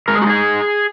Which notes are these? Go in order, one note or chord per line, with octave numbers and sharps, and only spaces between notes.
G#3 A#4
G#4
F#4
D#4 G#4